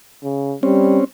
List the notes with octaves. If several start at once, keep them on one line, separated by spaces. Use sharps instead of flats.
C#3
G3 C4 C#4